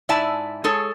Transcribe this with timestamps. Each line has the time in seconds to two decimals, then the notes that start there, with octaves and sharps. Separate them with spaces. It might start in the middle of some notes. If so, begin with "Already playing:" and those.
0.09 G#2 E4 D5 E5 G#5 A5
0.64 G#3 G#4 A4 C#5